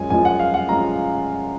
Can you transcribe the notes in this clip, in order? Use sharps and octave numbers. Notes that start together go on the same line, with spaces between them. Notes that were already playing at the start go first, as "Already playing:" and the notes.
Already playing: F#2 F3 G#3 C#4 G#5
F#2 F3 G#3 C#4 F4 G#5
F#5
F5
F#5
F3 G#3 C#4 F4 A#5